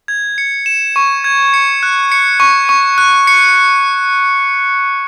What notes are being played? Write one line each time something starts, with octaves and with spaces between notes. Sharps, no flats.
G#6
C#7
E7
C#6
G#6
C#7
F#6
C#7
C#6
C#6
F#6
C#7